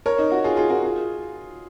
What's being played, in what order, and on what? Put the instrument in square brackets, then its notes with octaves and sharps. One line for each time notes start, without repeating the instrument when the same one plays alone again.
[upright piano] A#4 C#5
D#4
D#4 F#4
F4 G#4
F4 G#4
F#4 A#4
F4 G#4